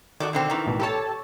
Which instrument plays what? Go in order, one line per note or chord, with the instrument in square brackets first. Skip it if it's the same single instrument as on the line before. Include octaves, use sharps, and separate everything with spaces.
[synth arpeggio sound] D#3 [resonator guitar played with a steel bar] F#4 A4 D5
[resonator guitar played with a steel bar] B2 D3 C4
D#3 E3
[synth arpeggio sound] A1 B2
[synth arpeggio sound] G4 A4 A5 [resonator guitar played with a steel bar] B4 C#5